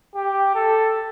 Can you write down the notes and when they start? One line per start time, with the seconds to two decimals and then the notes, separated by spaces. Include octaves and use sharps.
0.15 G4
0.55 A4